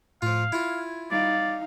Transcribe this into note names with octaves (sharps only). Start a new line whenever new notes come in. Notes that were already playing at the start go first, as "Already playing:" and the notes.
A2 F3 F4 F5
E4 F4 G#6
G3 D#4 D5 F5